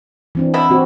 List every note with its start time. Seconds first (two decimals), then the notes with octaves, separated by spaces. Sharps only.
0.35 E3 C4 D4
0.54 B2 B3 E4
0.70 C4 F#4 G4